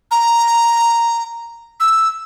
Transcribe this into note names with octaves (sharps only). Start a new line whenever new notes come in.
A#5
E6